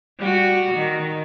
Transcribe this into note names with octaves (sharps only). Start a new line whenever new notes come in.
G3 F#4
D#3